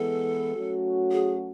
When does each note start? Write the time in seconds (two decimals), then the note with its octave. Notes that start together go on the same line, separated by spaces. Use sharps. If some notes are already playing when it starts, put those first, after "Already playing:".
Already playing: E3 G#3 B3 A4
0.55 F#3 A3 C#4 F#4
1.12 G#4